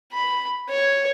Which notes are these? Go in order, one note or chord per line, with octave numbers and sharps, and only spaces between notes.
B5
C#5